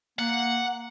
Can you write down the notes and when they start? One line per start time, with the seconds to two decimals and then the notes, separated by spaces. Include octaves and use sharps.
0.19 A#3 F#5